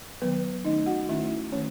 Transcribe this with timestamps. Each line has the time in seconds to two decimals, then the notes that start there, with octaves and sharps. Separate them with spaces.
0.22 D#3 F#3 B3 B4
0.65 D#3 A3 C#4 D#4 D#5
0.86 F#4 F#5
1.08 D#3 A3 C#4 E4 E5
1.52 D#3 A3 C#4 C#5